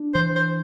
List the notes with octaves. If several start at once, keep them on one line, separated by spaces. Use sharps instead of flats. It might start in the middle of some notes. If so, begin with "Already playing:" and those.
Already playing: D4
E3 C5
C5